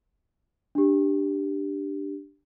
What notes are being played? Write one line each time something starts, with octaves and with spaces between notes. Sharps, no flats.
D4 G4